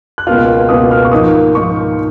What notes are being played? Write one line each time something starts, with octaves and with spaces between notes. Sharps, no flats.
F#6
C#2 B2 A#3 F4 F6
C#2 B2 A#3 F4 D#6
F6
C#6
G#2 F3 A#3 D#4 D#6
G#2 F3 A#3 D#4 C#6